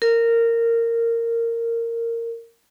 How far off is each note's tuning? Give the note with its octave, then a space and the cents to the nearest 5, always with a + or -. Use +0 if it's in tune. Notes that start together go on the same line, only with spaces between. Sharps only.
A#4 -15